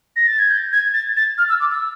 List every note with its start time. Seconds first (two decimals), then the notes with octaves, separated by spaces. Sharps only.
0.16 A#6
0.27 A6
0.39 G#6
0.50 G6
0.73 G#6
0.94 A6
1.17 A6
1.38 F6
1.49 E6
1.60 D6
1.72 E6